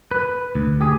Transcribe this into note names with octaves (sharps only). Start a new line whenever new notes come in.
B4
D2
G4 G#4